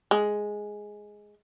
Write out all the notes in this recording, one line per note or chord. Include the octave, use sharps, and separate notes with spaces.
G#3